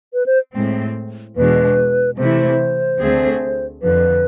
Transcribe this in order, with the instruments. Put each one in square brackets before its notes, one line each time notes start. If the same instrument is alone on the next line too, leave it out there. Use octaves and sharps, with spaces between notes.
[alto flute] B4
C5
[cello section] A2 G#3 C4
[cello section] E2 B2 G#3 D4 [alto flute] B4
[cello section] C3 E3 A3 E4 [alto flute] C5
[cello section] D2 D3 A3 C4 G#4
[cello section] F2 D3 F3 [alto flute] B4